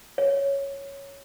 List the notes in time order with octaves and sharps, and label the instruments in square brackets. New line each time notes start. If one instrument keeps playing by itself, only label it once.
[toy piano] C#5